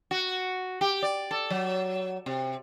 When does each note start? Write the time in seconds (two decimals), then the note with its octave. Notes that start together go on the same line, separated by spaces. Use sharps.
0.11 F#4
0.81 G4
1.02 D5
1.31 A4
1.50 F#3
2.26 C3